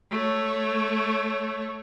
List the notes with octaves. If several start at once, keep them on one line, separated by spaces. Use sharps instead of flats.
A3 C#5